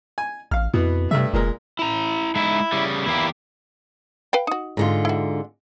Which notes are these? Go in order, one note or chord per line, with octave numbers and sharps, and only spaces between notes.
G#5
A1 F5 F6
F2 B2 E3 B3
G2 C3 A3 E5
F1 A#2 G#3 A#4
E4 A#5
G#3 D#4 E4 E5
C#3 G3
E2 A#3 E4 G4
B4 F5 G5
D#4 F#4
G#2 D3 F4
E4 F#4